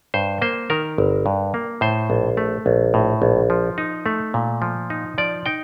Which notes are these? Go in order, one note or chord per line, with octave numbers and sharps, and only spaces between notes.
G2 C5
A#3 C5
D#3 A#4
G1
G2
A#3
A2 C5
A#1
A3
A#1
A2
A#1
F3
D#4
A3
A#2
F3
D#4
F3 D5
D#4 G5